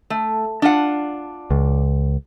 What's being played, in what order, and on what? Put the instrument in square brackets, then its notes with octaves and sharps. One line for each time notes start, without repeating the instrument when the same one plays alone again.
[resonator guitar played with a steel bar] A3
D4 F4 F#5
[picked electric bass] C#2